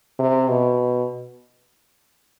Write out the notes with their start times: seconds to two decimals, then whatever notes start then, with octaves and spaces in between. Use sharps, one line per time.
0.19 C3
0.50 B2